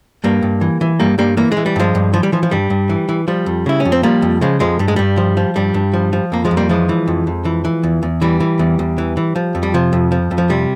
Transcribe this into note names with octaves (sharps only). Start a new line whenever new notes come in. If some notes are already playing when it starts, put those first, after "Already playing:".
G2 G3 A#3
G2
E3
E3
G2 G3 A#3
G2 G3 A#3
E3 A#3
G#3
E3
G3
G2 F3 G#3
G2
E3 F3
G3
E3 F3
F3
G2 G3
G2
E3
E3
F3 G3
F2
C#3 E4
C#4
F2
C4
F3 G3 A#3
F2
C#3 F3 G#3
F2 F3 G#3
G2 G3
G#3
G2 G3
F3
F3
G2 G3
G2
F3
F3
F2 A#3
F3 G#3
F2
G3 A#3
E3 F3 G#3
E3
F2
F2
E3
E3
E2
E2
E3 G3
E3
E2
E2
E3
E3
F3
F2
G3
C3 F3
F2
F3
F2
F3
C3 G3